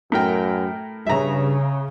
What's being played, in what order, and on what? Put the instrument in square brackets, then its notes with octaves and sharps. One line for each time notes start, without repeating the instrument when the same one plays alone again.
[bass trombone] F#2 [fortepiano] A2 A#4 G5
[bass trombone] G2 [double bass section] C#3 [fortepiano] E5 A#5